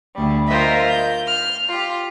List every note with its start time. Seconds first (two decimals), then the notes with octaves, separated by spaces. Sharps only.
0.16 D2 G3
0.49 F4 A#4 C5 D#5 E5
0.90 G6
1.27 F6
1.69 F4 G4